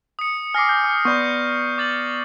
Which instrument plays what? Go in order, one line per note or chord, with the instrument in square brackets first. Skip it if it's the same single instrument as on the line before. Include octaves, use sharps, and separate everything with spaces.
[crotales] D#6 C#7
[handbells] G#5 D6 [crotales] F6 A#6 C7
[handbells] G6
D#6
[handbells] B3 D5 B5 [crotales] C#6 G6
[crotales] D6 A6 F#7